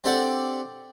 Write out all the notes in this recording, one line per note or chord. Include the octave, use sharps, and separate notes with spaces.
C4 D4 G4 A4 D5 F#5